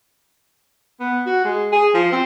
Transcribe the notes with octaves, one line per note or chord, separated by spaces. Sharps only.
B3
F#4
G#3
G#4
F3
C4